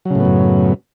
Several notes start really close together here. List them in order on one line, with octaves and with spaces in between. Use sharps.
F#3 C#3 A2 B3 F#2